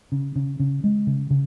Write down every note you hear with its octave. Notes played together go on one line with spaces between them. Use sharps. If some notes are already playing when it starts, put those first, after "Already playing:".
C#3
C#3
C#3
G#3
C#3
C#3